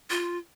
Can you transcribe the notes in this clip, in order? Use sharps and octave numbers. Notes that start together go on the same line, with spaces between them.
F4